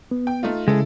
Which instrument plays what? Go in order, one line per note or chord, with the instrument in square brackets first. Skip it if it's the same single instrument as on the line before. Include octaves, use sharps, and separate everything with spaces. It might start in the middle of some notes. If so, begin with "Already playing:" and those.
[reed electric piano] B3
[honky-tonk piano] G5
A3 D#4 F4
[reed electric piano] C#3 [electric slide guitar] G#3 [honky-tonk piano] E4 A4